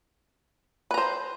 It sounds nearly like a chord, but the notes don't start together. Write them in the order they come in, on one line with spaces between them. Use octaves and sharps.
B4 A#5 C5